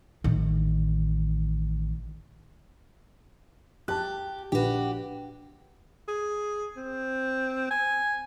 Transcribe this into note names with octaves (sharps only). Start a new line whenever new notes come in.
A1 D#3
G4 A5 F#6
A#1 F#4 G4 B4
G#4
C4
G#5